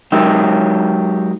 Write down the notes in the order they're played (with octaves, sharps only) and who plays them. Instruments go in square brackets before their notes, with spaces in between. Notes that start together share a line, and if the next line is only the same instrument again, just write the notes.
[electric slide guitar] F#3 G#3 D#4 G4 A#4 E5